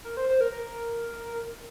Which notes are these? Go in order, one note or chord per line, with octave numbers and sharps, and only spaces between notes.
A#4
C5
C5
A#4
A#4